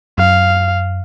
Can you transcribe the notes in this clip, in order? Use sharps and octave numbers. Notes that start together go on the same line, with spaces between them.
F#2 F5